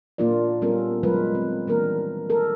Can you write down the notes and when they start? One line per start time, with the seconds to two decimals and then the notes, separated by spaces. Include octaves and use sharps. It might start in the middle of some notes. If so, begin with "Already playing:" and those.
0.18 A#2 A#3 D4 F4 A#4 D5
0.62 G3 B3 C#4 F4 A4 A#4
1.03 D#3 F#3 G#3 F4 A#4 B4
1.35 C4
1.67 D#3 E3 G3 A#3 D4 A#4
2.30 A4 A#4